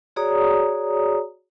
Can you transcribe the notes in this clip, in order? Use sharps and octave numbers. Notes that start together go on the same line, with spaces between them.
F#4 G#4 C#5 D5 A#5 D#6